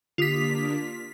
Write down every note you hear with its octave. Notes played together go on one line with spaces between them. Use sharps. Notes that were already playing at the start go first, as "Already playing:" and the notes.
D3 A#3 D4 F4 G4 D#6 B6